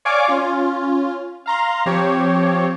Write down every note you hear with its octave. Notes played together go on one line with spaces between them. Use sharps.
C#5 D5 F5 G#5 D6
C#4 F4
F5 A#5 C6
F3 C4 G4 C#5